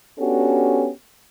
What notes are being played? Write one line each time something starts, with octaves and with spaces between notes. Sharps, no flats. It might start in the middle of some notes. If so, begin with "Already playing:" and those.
B3 C#4 D4 F#4 G4 A4